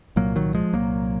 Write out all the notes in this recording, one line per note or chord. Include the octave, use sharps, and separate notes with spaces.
C2 A#2 F#3 A#3
D#3 F#3
F3 G#3
C2 A#2 F#3 A#3